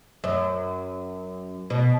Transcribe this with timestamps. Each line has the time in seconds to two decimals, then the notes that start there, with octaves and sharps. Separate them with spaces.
0.24 F#2
1.70 B2